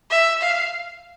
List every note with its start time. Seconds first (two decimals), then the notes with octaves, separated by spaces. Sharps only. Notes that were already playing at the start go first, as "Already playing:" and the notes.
0.11 E5
0.42 F5